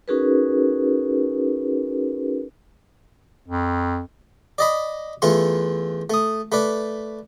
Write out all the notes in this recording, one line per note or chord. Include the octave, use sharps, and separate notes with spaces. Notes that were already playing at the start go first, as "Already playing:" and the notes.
C#4 D#4 F#4 G#4 A#4 B4
F2
D5 D#5 B5
E2 E3 A3 F4 C#6
A3 D#6
A3 B4 D5